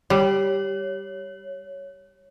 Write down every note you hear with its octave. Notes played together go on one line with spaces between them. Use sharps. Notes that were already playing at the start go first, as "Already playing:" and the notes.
G3 C#5